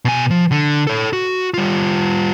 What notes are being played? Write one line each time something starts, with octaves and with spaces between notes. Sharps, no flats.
B2 G#5
F3
D3
A4 C#5
F#4
G3 F4